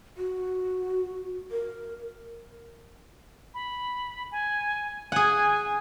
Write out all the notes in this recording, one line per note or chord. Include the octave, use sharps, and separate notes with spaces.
F#4
A#4
B5
G#5
G#4 F#5 G#5